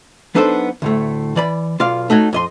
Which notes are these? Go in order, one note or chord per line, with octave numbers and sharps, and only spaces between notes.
F#3 B3 D4 D#4 A4 C5
D2 A2 A3
E3 D5 B5
B1 F4 D5 F5
A3 D#4 F#4 C#5
F2 D#5 C6